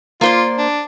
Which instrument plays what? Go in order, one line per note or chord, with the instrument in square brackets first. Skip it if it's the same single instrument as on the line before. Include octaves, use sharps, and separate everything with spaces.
[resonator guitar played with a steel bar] A#3 C5 D5 [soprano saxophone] F4
[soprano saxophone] D4